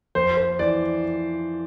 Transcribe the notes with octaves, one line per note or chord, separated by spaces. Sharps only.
F2 C5
C5
E3 D5